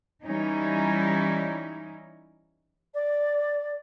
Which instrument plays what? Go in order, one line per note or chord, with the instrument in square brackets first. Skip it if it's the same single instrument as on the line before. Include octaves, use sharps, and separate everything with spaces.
[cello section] E3 G3 C#4 D#4 E4
[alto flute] D5